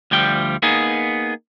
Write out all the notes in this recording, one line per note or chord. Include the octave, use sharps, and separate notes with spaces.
D2 F3 G3 G5
A#3 B3 D#4 G#4